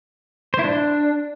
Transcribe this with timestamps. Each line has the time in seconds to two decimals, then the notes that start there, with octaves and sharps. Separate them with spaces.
0.54 C5
0.59 E4
0.64 D4